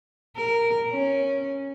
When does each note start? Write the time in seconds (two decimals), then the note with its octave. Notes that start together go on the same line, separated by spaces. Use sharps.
0.36 A#4
0.91 C#4